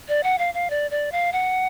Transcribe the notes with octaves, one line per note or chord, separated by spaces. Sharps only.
D5
F#5
F5
F5
D5
D5
F5
F#5